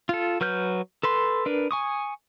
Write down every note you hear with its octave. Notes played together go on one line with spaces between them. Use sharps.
F4 A4
F#3 B4 F6 G6
A4 B4 C6
D4 A#4 B4
G#5 C#6 D#6